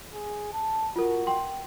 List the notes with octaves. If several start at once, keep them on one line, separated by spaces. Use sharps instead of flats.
G#4
A5
F4 F#4 A#4
G5 C6